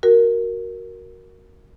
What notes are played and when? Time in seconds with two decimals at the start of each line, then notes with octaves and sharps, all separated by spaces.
0.03 F#4 A#4